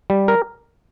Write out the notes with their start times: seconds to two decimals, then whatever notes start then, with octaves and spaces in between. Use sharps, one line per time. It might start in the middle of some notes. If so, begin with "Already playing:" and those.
0.10 G3
0.28 A#4